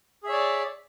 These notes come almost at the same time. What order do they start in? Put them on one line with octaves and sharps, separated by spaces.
G#4 E5 C#5 D5